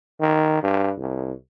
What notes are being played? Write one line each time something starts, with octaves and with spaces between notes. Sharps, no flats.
D#3
G2
C2